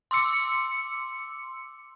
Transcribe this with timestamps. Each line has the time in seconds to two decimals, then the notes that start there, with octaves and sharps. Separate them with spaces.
0.11 C6 D6 E6 C#7